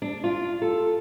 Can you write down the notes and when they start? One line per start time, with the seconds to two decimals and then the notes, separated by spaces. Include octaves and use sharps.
0.02 D4
0.24 F4
0.62 A4